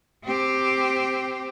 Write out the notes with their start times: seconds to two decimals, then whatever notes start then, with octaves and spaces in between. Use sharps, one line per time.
0.25 C4 G4